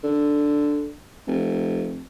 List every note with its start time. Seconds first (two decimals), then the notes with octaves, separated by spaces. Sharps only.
0.04 D3
1.27 F1